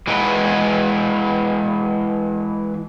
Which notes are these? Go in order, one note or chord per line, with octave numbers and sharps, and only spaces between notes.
E3 G#3 B3 E4 B4